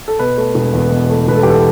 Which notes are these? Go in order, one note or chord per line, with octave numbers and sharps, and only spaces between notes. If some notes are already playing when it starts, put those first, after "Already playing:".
A4
B2 B4
A3
E1
E2
B2
A3
E1 B4
A4
E2 G4
A4